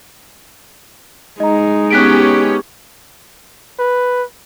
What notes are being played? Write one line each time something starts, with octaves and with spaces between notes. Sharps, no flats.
G#3 D#4 D#5 A#5
B3 C#4 G4 F#6 B6 D7
B4